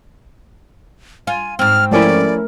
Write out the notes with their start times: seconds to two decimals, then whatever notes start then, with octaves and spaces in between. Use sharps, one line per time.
1.27 F4 G#5
1.59 G#2 C4 F6
1.91 F3 A3 C#4 E4 A#4 D5